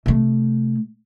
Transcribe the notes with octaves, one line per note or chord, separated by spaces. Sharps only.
C3 A3